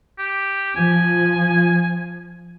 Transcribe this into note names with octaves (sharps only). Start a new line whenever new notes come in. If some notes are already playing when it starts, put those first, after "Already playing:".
G4
F3 G#5